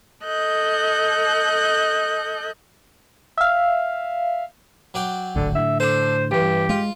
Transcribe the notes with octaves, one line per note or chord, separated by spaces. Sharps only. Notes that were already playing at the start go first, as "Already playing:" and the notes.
A4 D#5 F#6 G6
E5 F5
F#3 D5 G5
D1 G#1 D2 D3
A2 D3 E5
D4 A4 C5
A1 G2 G4
G#3 F4